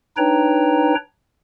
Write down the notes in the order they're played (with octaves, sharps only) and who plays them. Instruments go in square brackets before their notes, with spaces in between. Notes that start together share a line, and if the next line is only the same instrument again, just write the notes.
[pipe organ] D4 D#4 B4 C#5 G5 A#5